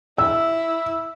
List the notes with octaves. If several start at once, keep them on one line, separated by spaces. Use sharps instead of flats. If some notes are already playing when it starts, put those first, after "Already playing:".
E4 E6